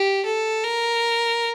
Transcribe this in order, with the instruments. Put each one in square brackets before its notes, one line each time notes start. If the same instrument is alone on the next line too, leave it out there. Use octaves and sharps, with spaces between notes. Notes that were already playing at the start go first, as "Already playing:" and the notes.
Already playing: [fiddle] G4
A4
A#4